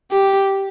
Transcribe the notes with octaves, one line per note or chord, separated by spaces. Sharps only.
G4